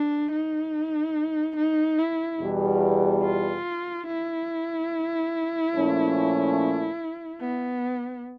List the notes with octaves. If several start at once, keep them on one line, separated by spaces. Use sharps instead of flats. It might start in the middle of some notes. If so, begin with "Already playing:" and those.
Already playing: D4
D#4
D#4
E4
E2 B2 G3
F4
E4
A#2 F3 A3 C#4
B3